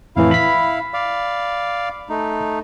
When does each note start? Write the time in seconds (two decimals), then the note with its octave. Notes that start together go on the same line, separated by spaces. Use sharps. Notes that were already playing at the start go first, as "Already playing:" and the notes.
0.16 F2 A2 E3 E4 F5
0.31 B5 B6
0.94 D5 F5
2.10 A3 D#4